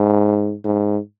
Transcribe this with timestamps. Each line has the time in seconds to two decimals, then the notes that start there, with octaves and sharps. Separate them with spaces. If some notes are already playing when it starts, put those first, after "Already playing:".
Already playing: G#2
0.65 G#2